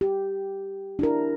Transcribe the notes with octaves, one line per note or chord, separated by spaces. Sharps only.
G4
D4 E4 A#4